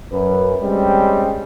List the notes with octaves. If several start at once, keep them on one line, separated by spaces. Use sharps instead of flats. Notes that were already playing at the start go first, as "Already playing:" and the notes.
F#2 B4
G3 G#3 C4 C#4